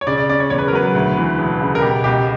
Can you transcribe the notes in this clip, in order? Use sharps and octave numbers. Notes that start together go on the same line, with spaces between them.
C#5
C#3 D5
D5
C#4 D5
C#5
E2 C#5
B4
A#4
F#3 B4
D2
E3
E1
C#3
A#4
B2 G4
C#2 G4